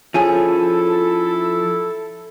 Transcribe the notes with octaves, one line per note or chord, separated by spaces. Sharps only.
F3 C#4 E4 G#4 A4